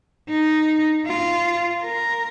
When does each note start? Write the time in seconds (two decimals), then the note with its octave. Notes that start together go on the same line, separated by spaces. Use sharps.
0.29 D#4
1.06 F4
1.84 A#4